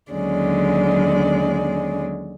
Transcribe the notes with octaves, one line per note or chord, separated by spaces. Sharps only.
D#2 D3 F#3 G#3 C#4 D5